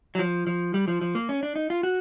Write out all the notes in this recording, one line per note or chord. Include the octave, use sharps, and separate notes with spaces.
F#3
F3
F3
G3
F3
F3
A#3
C#4
D4
D#4
F4
F#4